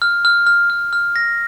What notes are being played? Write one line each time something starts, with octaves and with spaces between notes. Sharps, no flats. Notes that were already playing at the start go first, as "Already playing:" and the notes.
F6
F6
F6
F6
F6
A#6